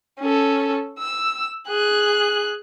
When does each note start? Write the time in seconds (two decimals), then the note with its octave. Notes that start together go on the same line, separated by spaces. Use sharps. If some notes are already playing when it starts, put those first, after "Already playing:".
0.20 C#4 A4
0.99 E6
1.68 G#4 F#6